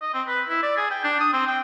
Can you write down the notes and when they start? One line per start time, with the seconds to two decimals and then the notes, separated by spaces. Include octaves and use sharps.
0.01 D#5
0.14 C4
0.28 B4
0.49 E4
0.63 D5
0.77 G#4
0.91 G5
1.04 D4
1.20 D#6
1.33 C4
1.47 G5